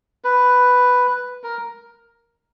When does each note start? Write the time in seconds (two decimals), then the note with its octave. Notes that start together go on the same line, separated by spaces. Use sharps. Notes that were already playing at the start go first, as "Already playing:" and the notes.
0.24 B4
1.44 A#4